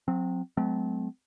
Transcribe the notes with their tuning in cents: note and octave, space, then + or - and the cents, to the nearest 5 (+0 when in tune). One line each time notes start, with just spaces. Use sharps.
F#3 -35 C4 +0
F#3 +0 A3 -40 C4 -30